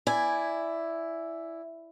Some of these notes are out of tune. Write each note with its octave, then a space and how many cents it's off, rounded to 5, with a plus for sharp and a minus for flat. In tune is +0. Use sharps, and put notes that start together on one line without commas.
E4 +5 D5 +0 G#5 +0